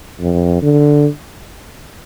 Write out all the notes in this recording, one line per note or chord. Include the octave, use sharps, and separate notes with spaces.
F2
D3